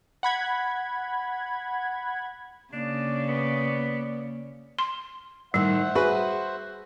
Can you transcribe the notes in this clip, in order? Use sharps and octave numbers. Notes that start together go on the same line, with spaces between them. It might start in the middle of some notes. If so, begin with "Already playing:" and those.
F#5 B5 G#6
C#3 A#3 D4 D5
B3
C6
A2 D#3 G3 C5 E5 F#5
F#4 G#4 B4